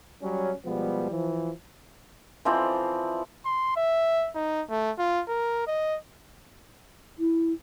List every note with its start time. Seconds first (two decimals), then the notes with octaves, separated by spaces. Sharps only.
0.22 F#3 G3 C#4
0.64 B2 F3 G3 G#3 B3
1.11 E3 F3
2.45 E3 F3 C4 D5
3.45 C6
3.76 E5
4.35 D#4
4.70 A3
4.99 F4
5.28 A#4
5.67 D#5
7.18 E4